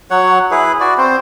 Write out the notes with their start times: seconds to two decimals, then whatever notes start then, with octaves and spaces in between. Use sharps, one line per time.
0.11 F#3 C#5 F#5
0.51 E4 G#4 B4
0.81 F#4 D5
0.98 C4 C5